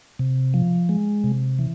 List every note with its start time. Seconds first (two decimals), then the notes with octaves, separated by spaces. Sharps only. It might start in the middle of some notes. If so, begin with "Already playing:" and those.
0.19 C3
0.54 F3
0.89 G#3
1.24 C3
1.59 E3